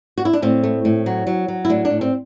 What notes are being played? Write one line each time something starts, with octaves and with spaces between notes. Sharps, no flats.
F#4
E4
D4
A2 C4
A3
A2
F#3
F#3
F#3
E4
A2 D4
D4
A2
C4